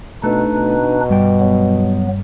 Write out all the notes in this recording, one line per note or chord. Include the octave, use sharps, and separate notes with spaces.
B2 A3 D4 D#4 B4
B2
G2 G3 G5
F#3 B3